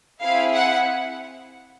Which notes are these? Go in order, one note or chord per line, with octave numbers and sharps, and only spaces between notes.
C4 E4 G#4 F5
F#5